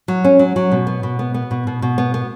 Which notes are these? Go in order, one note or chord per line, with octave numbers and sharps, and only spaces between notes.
F#3
C#4
F#3
F#3
B2
B3
B2
B3
B3
B2
B2
B2
B3
B3